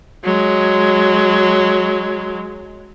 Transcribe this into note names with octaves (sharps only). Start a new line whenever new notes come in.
F#3 G#3